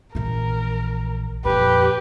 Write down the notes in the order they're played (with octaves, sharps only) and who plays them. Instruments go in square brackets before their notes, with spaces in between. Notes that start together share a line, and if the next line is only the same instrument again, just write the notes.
[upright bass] A#1 E3 [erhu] A#4
[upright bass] F2 A#2 [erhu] G4 [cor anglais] B4